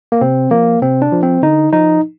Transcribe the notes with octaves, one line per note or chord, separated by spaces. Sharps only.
A#3
C3 C4
F3 A#3
C3 C4
D4
F3
C4
D3 D#4
F3 D#4